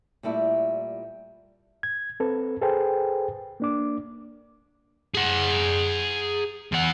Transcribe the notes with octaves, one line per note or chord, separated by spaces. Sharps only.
A#2 G3 A3 E4
G#6
C4 A4 B4
G#4 A4 B4 C5 G5
A#3 D4 D6
G#4 F#5
E2 F#5